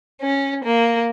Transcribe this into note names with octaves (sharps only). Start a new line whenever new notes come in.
C#4
A#3